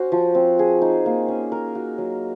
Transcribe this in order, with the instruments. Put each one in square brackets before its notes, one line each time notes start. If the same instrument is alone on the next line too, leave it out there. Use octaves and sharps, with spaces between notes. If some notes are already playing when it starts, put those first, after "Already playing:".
Already playing: [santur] C#4 F#4 C5
F3
C4
G#4
D#4
A#3
C#4
A#4
F#4
F#3